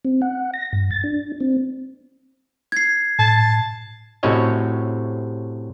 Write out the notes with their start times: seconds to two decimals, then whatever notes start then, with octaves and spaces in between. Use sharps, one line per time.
0.05 C4
0.22 F#5
0.54 A#6
0.73 G2
0.91 A6
1.04 D4
1.41 C4
2.72 G#6 C7
3.19 A2 A5
4.23 A2 C3 C#4 F#4 C#5 D#5